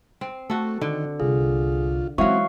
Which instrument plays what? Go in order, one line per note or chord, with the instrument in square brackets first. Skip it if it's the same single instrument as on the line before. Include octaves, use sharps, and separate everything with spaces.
[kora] C4
[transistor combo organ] A3 [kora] F#4 A4
[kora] D3 [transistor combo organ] D#3
[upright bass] C2 [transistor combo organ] F4 [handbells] G#4
[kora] E3 F#3 [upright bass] G#3 C#4 [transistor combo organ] C4 F#4 [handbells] F5 C#6